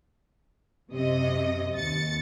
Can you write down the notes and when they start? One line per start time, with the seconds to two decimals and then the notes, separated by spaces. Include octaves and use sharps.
0.91 F#2 C3 D#5
1.75 D#2 A6 C#7